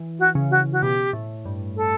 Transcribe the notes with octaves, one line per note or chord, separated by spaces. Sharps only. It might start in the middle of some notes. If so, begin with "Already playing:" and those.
Already playing: E3
F#4
C#3
F#4
F#4
B2 G4
A2
G2
A4